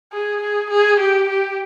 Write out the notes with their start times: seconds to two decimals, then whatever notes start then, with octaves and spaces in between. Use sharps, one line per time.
0.12 G#4
0.41 G#4
0.70 G#4
0.99 G4
1.29 G4